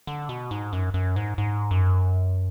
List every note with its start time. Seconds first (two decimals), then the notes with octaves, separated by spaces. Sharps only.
0.07 D3
0.29 B2
0.51 G#2
0.73 F#2
0.94 F#2
1.16 G#2
1.38 G#2
1.71 F#2